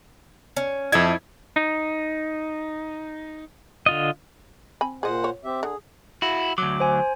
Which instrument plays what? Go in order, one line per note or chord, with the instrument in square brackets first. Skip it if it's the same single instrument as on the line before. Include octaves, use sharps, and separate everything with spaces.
[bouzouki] C#4
[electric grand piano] F2 E5 G#6 [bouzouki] E4 A4 D#5
[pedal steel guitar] D#4
D3 F4 D#5
[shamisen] C4 G#5 B5
[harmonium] A#2 C5 F#5 [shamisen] G#4 D#5
[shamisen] C#5
[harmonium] C4 G4 E5
[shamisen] D3 [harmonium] G#4
[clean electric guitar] E4 F#4
[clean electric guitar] D2 F#3 [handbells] D6
[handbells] C5 G#5